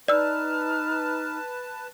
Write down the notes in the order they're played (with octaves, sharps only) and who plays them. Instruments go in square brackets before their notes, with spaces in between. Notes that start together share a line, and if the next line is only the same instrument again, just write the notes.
[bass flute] D#4 [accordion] B4 A5 [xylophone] D5 E6 [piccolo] F6